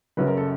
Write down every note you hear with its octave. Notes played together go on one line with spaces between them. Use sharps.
F#1 F#2 C#3 B4
A#4
A4